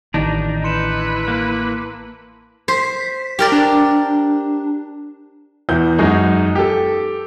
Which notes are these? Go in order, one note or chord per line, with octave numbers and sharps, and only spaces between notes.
A1 D#3 D4 D#4 A5 A#5
E4 B4 C6 C#7 E7
A#3
C5 B6
G4 A#4 D5
D4
E2 E3 G6
F#2 G#3 D#4 F#4
G4 A4